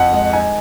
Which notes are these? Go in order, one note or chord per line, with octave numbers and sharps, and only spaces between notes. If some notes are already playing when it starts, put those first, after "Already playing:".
Already playing: F2 F#5
G#3
D#4 G#5